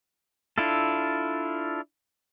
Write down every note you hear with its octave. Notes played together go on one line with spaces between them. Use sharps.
D4 E4 F4 A4